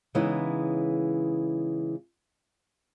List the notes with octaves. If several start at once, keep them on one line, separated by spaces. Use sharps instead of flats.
C#3 E3 G#3 B3 D#4 E4